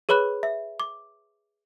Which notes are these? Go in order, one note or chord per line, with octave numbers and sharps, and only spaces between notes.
G#4 B4 C#5 B5 F#6
E5
D6